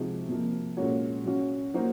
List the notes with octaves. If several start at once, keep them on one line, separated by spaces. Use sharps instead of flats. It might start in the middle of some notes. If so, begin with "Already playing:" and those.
Already playing: C3 F3 G#3 D#4 F#4
C3 F3 A#3
A#2 G#3 C#4 F#4 C#5
F#3 C#4 F#4
F#3 A#3 D#4 F#4 C5